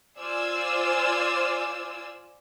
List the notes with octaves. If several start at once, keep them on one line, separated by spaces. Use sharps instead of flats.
F4 C5 D5 G#5 E6